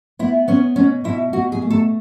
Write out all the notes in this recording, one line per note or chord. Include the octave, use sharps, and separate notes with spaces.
B3 E4
B3 C#4
B2 C#4
B2 E4
B2 F#4
G#4
A3
A4